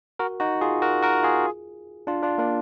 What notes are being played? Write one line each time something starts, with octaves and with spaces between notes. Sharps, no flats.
F#4 A#4
D#4 F#4
F4 G#4
F#4 A#4
F#4 A#4
F4 G#4
D4 F4
D4 F4
A#3 D4